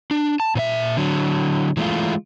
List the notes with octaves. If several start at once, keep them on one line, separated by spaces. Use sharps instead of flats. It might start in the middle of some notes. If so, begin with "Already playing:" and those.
D4
A5
A#2 C5 E5
D3 F#3
E3 G#3 A3 F4